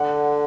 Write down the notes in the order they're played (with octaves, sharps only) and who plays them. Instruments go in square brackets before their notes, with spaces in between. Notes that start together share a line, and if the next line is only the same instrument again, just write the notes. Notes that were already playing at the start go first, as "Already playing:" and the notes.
Already playing: [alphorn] D3 [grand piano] F#5